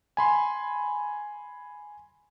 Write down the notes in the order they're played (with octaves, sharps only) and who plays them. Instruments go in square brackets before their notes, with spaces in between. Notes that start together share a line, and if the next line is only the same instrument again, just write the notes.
[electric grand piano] G#5 B5 C6